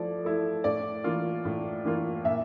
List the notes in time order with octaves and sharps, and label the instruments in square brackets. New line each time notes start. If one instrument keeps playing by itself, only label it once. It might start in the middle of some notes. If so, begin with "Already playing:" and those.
Already playing: [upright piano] F3 A3 E4 D5
A3 E4
A2 D5
E3 A#3 F4
A2
E3 A#3 F4
A#2 E5